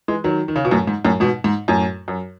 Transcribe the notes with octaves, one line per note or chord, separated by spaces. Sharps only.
E3 G#3
D#3 F#3
D#3
C#3
B2
F#2 A2
G#2
F#2 A2
G#2 B2
G#2
F#2 A2
F#2